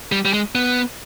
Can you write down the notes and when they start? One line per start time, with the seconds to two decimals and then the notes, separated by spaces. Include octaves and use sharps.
0.12 G3
0.25 G3
0.33 G#3
0.55 B3